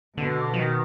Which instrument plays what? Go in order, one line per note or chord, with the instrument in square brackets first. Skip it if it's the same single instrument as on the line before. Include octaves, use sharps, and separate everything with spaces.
[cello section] B2 [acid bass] D3
[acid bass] F3
D#3